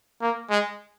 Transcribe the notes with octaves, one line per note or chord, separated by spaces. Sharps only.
A#3
G#3